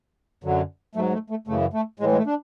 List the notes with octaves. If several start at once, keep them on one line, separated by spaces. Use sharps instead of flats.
F#2 D3 F#3
G#2 F#3 A3
A3
A3
F#2 C#3 E3 A3
A3
A2 E3 G#3
G#3
A3
D4